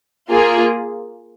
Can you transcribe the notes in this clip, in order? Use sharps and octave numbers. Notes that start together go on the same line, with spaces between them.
A#3 F4 G#4